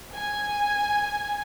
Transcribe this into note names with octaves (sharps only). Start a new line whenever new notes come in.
G#5